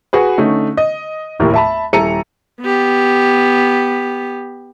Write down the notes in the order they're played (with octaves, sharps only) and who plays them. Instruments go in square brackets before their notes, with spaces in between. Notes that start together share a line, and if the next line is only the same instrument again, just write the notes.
[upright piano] F#4 G#4 B4
D3 A3 C#4 D#4
D#5
F1 D#2 A2 E4 A#4
E5 A5 B5
D#1 E4 A4 A#5 C#7 D#7
[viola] B3 G4